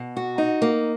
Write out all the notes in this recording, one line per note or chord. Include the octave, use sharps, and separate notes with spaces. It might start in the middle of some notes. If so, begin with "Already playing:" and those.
Already playing: B2
F#4
D#4
A#3